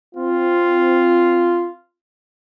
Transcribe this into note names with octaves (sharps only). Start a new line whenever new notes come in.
C4 F4